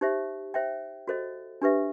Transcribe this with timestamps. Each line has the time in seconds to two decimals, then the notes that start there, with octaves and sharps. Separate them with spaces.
0.01 D#4 G4 C5 E5
0.54 C5 E5 G5
1.08 F#4 A4 C5 D#5
1.62 D4 G4 B4 E5